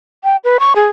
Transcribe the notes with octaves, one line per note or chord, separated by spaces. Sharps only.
G5
B4
C#6
G#4